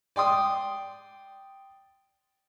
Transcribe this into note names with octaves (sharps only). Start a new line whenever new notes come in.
D5 G5 C6 D#6